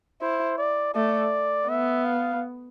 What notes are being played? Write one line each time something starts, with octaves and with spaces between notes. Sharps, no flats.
E4 C5
D5
A3 D5
B3 E5
F5